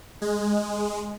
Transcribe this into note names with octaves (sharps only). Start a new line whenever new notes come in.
G#3